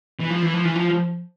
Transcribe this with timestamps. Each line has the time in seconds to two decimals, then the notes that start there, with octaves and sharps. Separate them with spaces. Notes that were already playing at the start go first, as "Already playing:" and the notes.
0.20 E3
0.31 F3
0.43 E3
0.54 F3
0.65 E3
0.75 F3